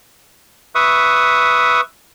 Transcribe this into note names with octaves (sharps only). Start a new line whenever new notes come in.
B4 E5 C#6 D#6